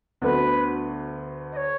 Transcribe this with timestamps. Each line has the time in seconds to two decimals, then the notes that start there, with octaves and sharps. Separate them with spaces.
0.22 D2 D3 F#3 B3 B4
1.52 D#5
1.57 C#5